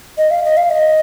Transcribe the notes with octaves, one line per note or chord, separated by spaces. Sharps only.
D#5
F5
D#5
F5
D#5